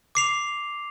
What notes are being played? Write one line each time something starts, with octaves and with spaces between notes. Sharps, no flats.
D6 C7 F7